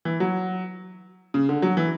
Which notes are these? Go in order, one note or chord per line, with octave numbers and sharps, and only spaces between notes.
E3
F#3
C#3
D3
F#3
E3